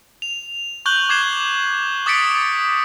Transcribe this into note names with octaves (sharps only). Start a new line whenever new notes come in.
F7
C#6 F#6 G6 F#7 G7
D6 G#6 C7 E7 G7
D6 D#6 A6 B6 C#7 D7